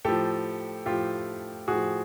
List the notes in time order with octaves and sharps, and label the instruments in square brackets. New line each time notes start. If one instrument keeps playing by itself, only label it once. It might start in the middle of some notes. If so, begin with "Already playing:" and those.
[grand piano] A2 F3 G4 A4
A2 F3 F4 G4
A2 F3 F#4 G#4